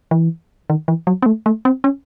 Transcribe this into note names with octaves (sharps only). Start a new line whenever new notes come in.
E3
D#3
E3
F#3
C4
A3
A3
C4
C#4